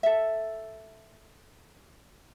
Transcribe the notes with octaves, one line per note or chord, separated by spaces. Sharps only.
A4 E5